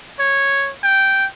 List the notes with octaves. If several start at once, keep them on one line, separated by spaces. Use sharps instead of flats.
C#5
G5